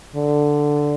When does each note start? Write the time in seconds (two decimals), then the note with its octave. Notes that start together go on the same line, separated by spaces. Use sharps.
0.15 D3